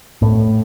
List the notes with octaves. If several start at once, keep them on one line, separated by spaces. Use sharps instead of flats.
A2